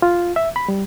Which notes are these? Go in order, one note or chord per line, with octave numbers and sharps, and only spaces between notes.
F4
E5
B5
G3